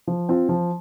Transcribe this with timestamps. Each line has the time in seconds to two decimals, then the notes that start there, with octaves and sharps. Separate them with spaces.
0.07 F3
0.29 C4 F4
0.49 F3